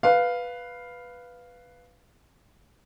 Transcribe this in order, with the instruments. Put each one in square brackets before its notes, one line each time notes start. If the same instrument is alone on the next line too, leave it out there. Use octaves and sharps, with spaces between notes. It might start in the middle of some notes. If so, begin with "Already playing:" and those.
[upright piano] B4 F5